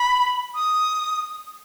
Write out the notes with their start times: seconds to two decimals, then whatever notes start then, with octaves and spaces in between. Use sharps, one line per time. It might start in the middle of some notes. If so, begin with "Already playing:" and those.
Already playing: B5
0.55 D#6